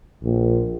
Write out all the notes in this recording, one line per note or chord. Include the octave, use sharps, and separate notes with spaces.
A#1